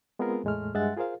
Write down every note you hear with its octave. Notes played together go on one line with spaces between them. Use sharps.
G#3 B3 C4 F4 G#4 A#4
E2 A2 G#3 A3 F6
G2 G#3 E5 F#5 F#6 A6
F4 G#4 A#4 C5 F5